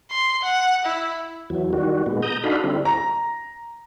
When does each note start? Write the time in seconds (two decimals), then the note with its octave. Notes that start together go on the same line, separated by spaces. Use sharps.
0.10 C6
0.43 F#5
0.85 E4
1.50 E2 E3 F#3
1.73 D#3 G3 F#4
2.06 A#2 G#3 B3
2.22 A#5 D#6 G6
2.44 D4 D#4 F#4 A4 F5 B5
2.64 D3 G3 C4 E4
2.85 A#5